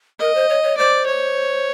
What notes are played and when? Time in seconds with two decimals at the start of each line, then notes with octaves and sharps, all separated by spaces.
0.20 A#4 D#5
0.35 C5
0.49 C#5
0.63 C#5
0.78 C5 D5
1.06 C#5